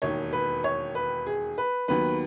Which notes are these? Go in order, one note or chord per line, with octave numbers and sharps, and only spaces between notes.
E1 D#2 D#3 C#5
B4
C#5
B4
G#4
B4
D#2 D#3 F#3 B3 B4